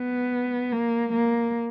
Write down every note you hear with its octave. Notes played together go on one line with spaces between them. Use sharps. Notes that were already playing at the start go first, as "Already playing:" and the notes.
Already playing: B3
A#3
A#3